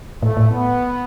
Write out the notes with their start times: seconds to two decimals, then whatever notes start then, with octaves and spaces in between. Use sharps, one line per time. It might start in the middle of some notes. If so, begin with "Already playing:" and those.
0.22 A2 A3
0.37 A2
0.50 B3